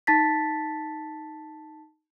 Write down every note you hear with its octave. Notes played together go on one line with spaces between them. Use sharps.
D#4 A5 A6 B6